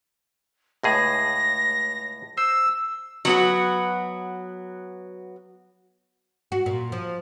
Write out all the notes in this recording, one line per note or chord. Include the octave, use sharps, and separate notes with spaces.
C#2 A2 G#4 A#6
C5 E6
F#3 B3 F#4
F#4
A#2
F3